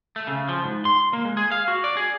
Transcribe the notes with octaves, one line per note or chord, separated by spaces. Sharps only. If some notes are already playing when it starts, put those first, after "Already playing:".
A3
C#3
F3
G#2
C6
A#3
G#3
G#4
F5
F#4
D5
G#4